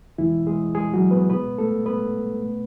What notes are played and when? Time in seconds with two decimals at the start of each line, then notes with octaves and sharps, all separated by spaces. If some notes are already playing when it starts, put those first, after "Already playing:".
0.18 E2 B2 E3 G#3 E4
0.47 G#3 G#4
0.74 G#3 G#4
0.94 F#3 F#4
1.11 B3 B4
1.30 B2 G#3 B3 B4
1.58 A3 A4
1.86 B3 B4
2.41 B2 A3